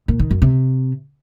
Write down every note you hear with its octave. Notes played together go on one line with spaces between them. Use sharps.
A#2
D#3
F#2
C3